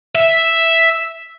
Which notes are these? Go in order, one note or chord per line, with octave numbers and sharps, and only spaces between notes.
E5